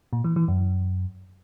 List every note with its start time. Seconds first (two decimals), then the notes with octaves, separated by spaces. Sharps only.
0.13 A#2
0.24 E3
0.36 E3
0.48 F#2